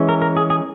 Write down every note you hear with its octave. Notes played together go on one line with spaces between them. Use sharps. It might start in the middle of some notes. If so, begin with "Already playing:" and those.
Already playing: E3 G#3 C#4
A#4
A#4
G#4
G#4